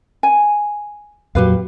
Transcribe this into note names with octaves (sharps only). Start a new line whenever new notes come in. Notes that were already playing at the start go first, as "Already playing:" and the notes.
G#5
F2 A#2 F#3 G4 B4 F5